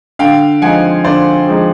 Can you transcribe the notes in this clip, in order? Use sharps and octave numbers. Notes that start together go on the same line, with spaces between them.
D3 F5 G5
F3 G#3 C4 D#4 F#5 G#5
D3 C5 D5
F3 G#3 C4 D#4